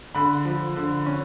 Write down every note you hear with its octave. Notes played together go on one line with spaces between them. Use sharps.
D3 B5
F3
D3
C#4